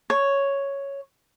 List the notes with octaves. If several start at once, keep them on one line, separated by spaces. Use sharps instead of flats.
C#5